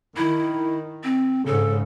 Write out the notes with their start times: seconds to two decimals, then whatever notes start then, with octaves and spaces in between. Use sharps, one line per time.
0.17 D#3 E4
1.04 C4
1.46 G#2 C#3 A4